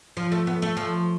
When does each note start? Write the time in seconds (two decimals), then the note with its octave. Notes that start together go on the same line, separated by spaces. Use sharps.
0.17 F3
0.32 A3
0.47 B3
0.62 A3
0.77 F3